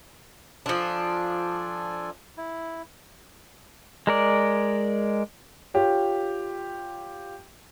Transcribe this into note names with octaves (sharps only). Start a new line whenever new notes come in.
F3 D4 F4 A4 G#5
E4
G#3 A#4 D5
F4 G4 C#5